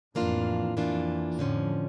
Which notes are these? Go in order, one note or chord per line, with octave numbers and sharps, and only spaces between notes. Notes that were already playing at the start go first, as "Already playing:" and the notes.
F2 A2 E3 A#3 D4 F4
F2 E3 A#3 D4 F4
F2 A2 D3 F3 C#4